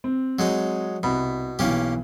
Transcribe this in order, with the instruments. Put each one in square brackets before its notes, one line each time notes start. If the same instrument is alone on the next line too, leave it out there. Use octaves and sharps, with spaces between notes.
[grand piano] C4
[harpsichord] F#3 G#3 D#4
[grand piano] C2 B5 [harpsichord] B2
[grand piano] B1 E3 [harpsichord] A#3 C#4 G4